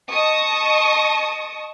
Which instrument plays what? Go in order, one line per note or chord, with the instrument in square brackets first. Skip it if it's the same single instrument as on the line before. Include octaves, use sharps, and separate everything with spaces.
[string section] D#5 A5 C#6 D#6